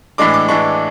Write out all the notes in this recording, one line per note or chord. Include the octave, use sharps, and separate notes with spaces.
A2 E3 G#3 D4 D6
D6
A2 E3 G#3 D4 C#6